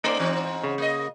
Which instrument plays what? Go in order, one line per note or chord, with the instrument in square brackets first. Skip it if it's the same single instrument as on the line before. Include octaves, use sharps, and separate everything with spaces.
[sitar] A3 [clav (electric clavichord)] D#4 C5 D5
[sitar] G#2 E3 C4
[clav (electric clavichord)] C#3
[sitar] A#3 D#5